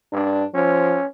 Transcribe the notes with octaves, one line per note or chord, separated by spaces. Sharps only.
G2 D4
F3 C#4